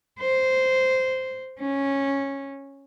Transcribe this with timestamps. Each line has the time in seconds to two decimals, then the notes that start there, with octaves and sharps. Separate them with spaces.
0.20 C5
1.60 C#4